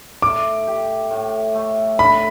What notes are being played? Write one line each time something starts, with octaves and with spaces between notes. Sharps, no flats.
A3 D6
G4
A2
A3
D3 B5